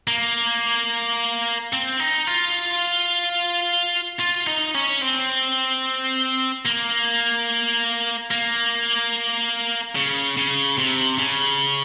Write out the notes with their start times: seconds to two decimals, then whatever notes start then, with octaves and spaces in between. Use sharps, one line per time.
0.08 A#3
1.73 C4
2.00 D#4
2.27 F4
4.20 F4
4.47 D#4
4.75 C#4
5.02 C4
6.66 A#3
8.31 A#3
9.96 C#3
10.37 C#3
10.78 C3
11.18 C#3